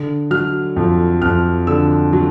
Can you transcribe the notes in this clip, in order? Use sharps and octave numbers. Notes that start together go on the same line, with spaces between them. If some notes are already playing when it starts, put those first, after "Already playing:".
Already playing: D3
F#3 F6
F2
F2 F6
D3 E6
F#3